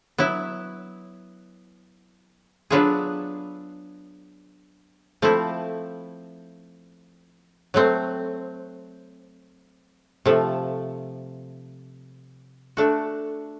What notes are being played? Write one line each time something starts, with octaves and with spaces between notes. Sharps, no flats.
F#3 B3 E4
F#3 B3 D4 F4 G#4
F3 A3 C4 E4
F#3 A3 C4
C3 F3 A3
A3 D4 F#4